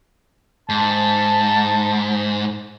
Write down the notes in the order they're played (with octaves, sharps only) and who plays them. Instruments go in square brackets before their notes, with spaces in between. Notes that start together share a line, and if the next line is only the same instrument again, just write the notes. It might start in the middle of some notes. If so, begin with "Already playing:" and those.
[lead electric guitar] G#2 [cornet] A5